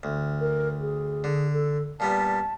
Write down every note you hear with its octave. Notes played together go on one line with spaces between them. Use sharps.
D2
A#4
G#4
D3
A4
A#2 G3 B3 A5